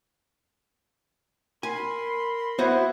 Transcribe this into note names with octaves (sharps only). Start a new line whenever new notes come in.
A#4 G#5 B5 C6
B3 E4 F#4 C5